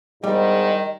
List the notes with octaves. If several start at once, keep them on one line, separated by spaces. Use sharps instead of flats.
E2 G#2 D#3 G3 D#5